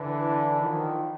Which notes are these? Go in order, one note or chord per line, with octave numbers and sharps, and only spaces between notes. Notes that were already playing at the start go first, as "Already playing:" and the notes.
Already playing: D3 E3
D#3 F3